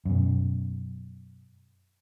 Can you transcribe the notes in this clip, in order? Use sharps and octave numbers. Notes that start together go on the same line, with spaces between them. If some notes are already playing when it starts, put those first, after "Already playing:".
F#2 B2